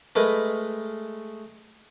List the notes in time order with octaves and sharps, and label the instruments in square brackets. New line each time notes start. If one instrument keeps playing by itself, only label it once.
[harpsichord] G#3 A3 [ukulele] A#4 B4 D#5